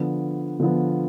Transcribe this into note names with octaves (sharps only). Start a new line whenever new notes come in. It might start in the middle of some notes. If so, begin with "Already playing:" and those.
Already playing: D3 F3 B3
D3 F3 B3